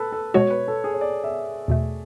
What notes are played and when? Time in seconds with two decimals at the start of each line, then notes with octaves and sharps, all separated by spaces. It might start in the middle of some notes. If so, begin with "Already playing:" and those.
Already playing: A4 B4
0.12 A4
0.34 B2 G#3 B3 F#4 C#5
0.50 B4
0.68 A4
0.84 G#4
0.94 C#5
1.01 D5
1.24 E5
1.68 E2 B2 A3